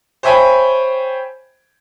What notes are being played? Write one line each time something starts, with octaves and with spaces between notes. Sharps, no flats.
C5 C#5 E5 G5 G#5 B5